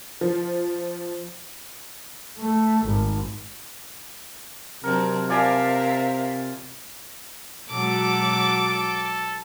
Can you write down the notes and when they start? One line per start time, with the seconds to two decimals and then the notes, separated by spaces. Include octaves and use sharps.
0.21 F3
2.39 A3
2.86 G#1
4.84 C3 F#3 C4 D4 A#4
5.29 F3 A#4 D5 E5 F5 G#5
7.70 B2 F#3 G#3 A4 D6
8.68 A4